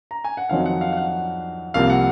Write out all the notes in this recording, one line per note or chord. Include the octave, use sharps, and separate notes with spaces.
A#5
G#5
F#5
F2 D#3 F#3 C4 D#4 F5
F#5
F5
F5
F#5
C2 C3 F3 A#3 F5
F#5